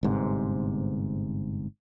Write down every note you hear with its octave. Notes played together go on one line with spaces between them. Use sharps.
G1 G#2 C3